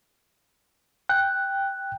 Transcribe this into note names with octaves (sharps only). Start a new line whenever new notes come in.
G5 F#6